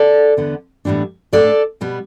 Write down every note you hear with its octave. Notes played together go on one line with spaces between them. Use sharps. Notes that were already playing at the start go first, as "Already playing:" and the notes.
Already playing: A4 D5
E2 D3 B3
A2 E3 G3 B3 D4
A2 A3 D4 A4 D5
B2 G3 B3